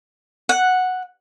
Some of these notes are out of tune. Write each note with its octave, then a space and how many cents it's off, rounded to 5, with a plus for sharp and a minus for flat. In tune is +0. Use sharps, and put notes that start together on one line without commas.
F#5 -5